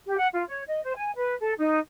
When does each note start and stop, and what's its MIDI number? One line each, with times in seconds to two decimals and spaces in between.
0.06 0.15 67
0.18 0.27 78
0.33 0.43 65
0.48 0.63 73
0.67 0.83 75
0.84 0.96 72
0.96 1.11 80
1.16 1.35 71
1.41 1.53 69
1.59 1.78 63